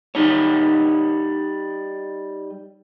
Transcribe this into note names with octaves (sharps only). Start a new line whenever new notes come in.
G3 D#4 C#5